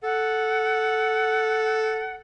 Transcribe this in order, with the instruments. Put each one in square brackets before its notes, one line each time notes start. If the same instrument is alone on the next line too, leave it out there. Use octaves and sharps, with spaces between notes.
[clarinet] A4 [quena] F#5